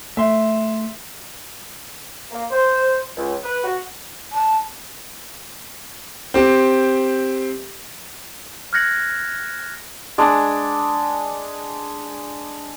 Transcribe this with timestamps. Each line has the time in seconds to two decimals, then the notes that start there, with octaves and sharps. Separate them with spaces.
0.17 A3 E5 C6
2.31 A#3
2.50 C5
3.17 C#2
3.43 B4
3.64 F#4
4.32 A5
6.34 C4 G4
8.73 F6 F#6 G#6 A#6 C#7 F#7
10.18 G#3 D4